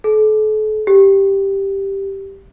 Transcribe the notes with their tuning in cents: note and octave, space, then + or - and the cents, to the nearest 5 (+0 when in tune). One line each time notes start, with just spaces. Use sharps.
A4 -40
G4 +0